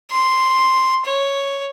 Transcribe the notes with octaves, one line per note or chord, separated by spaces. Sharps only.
C6
C#5